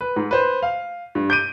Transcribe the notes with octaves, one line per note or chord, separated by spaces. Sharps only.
B4
G#2
B4 C5
F5
G2
G6 D7 D#7